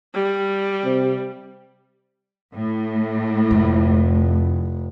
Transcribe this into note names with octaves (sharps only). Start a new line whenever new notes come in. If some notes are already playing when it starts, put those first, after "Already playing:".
G3
C3
A2
F1 F2